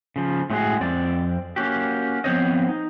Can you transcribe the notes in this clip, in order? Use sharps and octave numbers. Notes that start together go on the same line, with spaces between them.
C#3 F3
A2 G#3 C#4 D#4 F#4 G#4
F2 C4 D5
A#3 C#4 F#4 G4
F3 B3 C4 C5 C#5 D#5
D#4